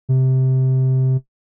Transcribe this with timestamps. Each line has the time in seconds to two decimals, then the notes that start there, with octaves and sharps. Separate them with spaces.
0.09 C3